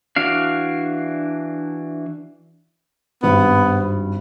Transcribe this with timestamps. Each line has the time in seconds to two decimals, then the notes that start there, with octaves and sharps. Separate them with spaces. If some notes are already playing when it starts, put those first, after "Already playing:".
0.16 E3 D4 F#4 F5
3.23 G#1 G2 B3